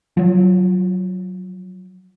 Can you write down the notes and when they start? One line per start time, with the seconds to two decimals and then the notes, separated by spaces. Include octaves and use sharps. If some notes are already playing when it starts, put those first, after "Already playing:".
0.17 F3 F#3